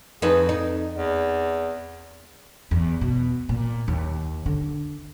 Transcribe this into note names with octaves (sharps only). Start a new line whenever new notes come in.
F2 D#4 G#4 B4
F2 D#4
E2
E2
B2
A#2
D#2
D3